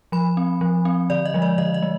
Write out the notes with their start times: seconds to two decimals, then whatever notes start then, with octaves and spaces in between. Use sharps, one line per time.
0.12 F3 B5
0.37 C4
0.61 F3
0.85 C4
1.10 D3 D5
1.25 D#5
1.34 F3 G#3
1.42 D5
1.58 D3 D#5
1.74 D#5
1.82 G#3